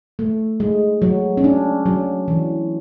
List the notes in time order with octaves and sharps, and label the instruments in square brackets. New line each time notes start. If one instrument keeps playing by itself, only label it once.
[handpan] A3
G#3
F#3
C#4
D4
F#3
E3